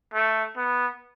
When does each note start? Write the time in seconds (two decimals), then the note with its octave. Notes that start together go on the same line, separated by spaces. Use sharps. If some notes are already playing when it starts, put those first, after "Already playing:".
0.14 A3
0.57 B3